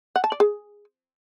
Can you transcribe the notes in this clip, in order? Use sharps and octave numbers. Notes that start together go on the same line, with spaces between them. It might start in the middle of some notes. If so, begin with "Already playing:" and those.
F#5
A5
D5
G#4